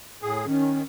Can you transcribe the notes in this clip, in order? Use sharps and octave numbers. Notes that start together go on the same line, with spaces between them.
A2 G#4
D#3 C#4